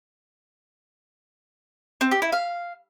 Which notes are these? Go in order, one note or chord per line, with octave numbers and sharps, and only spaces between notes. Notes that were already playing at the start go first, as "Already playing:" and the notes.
C4
G4
E4
F5